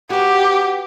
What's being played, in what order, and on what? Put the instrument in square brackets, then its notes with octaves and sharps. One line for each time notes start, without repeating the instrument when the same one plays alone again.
[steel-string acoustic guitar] B3 F#4 [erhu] G4